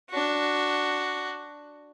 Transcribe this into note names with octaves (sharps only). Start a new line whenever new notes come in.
D4 F#4